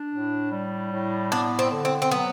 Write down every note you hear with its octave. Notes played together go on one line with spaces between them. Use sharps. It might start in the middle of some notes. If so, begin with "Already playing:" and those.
Already playing: D4
A2
G3
A2
B3 D4
C4
D3
C4
C4
F#3 B3